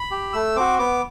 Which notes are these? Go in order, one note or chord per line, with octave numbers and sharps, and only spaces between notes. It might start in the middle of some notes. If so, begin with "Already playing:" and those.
Already playing: B5
G4
A3 E6
C4 F#4 D6
B3 D6